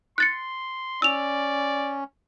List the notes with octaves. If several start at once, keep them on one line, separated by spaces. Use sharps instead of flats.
C6 F#6 A6 C#7
C#4 D5 E6 F7